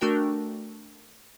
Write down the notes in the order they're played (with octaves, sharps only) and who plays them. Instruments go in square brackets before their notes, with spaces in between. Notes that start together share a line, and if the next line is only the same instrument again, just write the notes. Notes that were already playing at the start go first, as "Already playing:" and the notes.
[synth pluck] A3 D4 F#4 A#4 G5